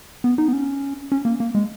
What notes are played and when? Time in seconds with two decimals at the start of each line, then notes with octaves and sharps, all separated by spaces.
0.24 B3
0.38 D#4
0.48 B3
0.53 C#4
1.12 C#4
1.25 A#3
1.40 A#3
1.55 G#3